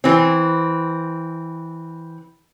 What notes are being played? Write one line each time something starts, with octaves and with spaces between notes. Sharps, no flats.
E3 C4